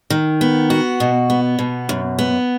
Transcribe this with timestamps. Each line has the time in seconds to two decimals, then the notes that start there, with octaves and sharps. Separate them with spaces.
0.10 D#3
0.41 B3
0.70 F#4
1.00 B2
1.30 B3
1.59 B2
1.89 F#2
2.19 B3